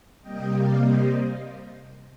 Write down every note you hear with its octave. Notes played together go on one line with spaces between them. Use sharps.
C3 G3 A#3 D#5 G5
D5 F5
C5 D#5